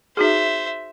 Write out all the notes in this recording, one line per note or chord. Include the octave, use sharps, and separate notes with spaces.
D#4 F#4 G#4 C5 E5